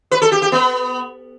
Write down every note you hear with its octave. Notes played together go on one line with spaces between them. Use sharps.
B4
A4
G4
G4
B3